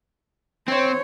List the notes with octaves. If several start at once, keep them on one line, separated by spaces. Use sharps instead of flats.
C4 C5 C#5